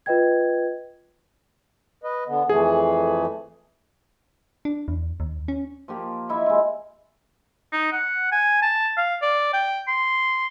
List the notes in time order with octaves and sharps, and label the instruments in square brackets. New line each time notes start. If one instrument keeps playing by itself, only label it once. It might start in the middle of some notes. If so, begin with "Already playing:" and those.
[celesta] F4 B4 D#5 G5 G#6
[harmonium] B4 D#5
D3 B3
[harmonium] F2 E3 A3 [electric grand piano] G#4
[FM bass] D4
E2
D#2
C#4
[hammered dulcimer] F3 A#3 G4
D#4 E4 E5
G#3 F4
[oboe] D#4
F#5
G#5
A5
F5
D5
G5
C6